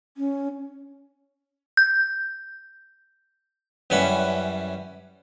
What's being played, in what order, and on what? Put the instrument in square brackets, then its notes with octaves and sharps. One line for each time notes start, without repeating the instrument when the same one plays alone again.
[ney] C#4
[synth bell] G6
[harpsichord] F#2 E3 G3 C#4 F#5 B5